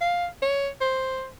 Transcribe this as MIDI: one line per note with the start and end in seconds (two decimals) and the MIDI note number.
0.01 0.27 77
0.42 0.69 73
0.81 1.29 72